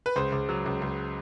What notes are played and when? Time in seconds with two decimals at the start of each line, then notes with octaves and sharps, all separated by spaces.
0.06 B4
0.16 C#2 C5
0.32 C#2
0.49 F#3
0.66 C#2
0.82 C#2